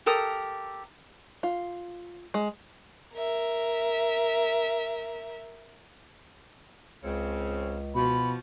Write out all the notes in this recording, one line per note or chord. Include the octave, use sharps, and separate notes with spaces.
G4 A4 A#4 D#6
F4
G#3
A#4 E5
C#2 C#3 C4
B2 F3 F#4 B5